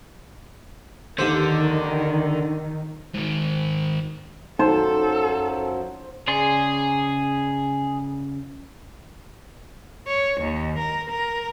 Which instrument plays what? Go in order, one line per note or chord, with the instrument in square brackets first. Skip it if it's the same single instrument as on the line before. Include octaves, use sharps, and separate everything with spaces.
[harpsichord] D#2 G4 C5 [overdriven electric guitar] D3 [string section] D#3
[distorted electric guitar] G#2 D#3
[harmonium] F#2 F3 F#3 [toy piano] D#4 [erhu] A4 [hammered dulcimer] C5
[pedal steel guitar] C#3 D5 C6 [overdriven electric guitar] G#4
[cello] C#5
D#2
A#4
A#4